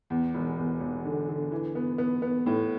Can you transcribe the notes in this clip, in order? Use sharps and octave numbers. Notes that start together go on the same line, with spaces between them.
E2
E1
E2
E1
D3
D3
E3
B3
B3
B3
A2